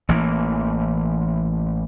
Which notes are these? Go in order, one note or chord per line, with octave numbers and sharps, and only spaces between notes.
A1 E3 A#3